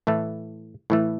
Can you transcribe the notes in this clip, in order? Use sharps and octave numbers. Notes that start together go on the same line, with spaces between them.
A2 E3 A3
A2 E3 A3